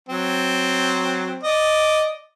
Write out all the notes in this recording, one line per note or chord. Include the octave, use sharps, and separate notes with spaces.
F#3 C4
D5 D#5